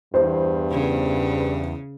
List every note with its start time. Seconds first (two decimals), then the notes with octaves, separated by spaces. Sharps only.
0.14 E2 G2 C5
0.71 C#3